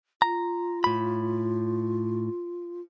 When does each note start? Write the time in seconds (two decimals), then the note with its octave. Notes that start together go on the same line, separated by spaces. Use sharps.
0.22 F4 A#5
0.84 A2 B5